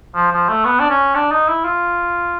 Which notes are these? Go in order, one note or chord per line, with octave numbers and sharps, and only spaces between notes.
F3
F3
A3
B3
D4
C#4
D4
D#4
E4
F4